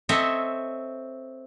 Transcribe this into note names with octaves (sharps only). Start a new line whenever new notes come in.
C4 A4 C5 C#5 D#5 E5